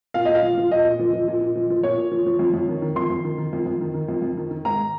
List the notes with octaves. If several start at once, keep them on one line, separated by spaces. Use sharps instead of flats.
A#2 F5
A#2 D#5
F5
F3
F3
A#2 D#5
A#2
F3
F3
A#2
A#2
F3
F3
A#2 C#5
A#2
F3
F3
F2
F2
D#3
D#3
F2 C6
F2
D#3
D#3
F2
F2
D#3
D#3
F2
F2
D#3
D#3
G#2 A#5